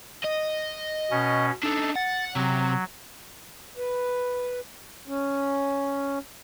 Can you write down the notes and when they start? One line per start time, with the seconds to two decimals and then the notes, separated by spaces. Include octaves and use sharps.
0.24 D#5
1.11 B2 C#4
1.63 D4 D#4 A4
1.96 F#5 A6
2.35 C3 F#3
3.77 B4
5.08 C#4